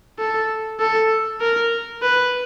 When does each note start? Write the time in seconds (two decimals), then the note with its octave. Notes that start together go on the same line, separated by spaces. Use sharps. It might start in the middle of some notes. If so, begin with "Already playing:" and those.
0.19 A4
0.80 A4
1.41 A#4
2.02 B4